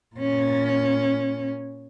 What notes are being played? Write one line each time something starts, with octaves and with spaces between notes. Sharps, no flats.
A#2 C#4